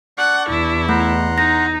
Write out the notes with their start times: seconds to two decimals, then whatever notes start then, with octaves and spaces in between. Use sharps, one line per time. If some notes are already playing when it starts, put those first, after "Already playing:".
0.18 D4 D5 F#5 C#6
0.49 E2 E4
0.89 A3 F#5 A#5 C6
1.38 D#4 A#6